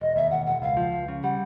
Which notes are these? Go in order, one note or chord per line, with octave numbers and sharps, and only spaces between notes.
E1 D#5
D#2 E5
E1 F#5
E1 F#5
C#2 F5
F3
C#2
C#3
G3 F#5